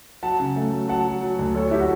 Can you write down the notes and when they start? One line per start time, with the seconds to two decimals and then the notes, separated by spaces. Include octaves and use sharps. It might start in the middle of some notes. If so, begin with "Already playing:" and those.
0.23 F#3 F#5 A5
0.40 C#3
0.56 A3
0.73 F#3
0.88 F#3 F#5 A5
1.05 F#3
1.21 F#3
1.39 D2
1.55 F#3 A4 C#5
1.71 E4 G4
1.80 F#4 A4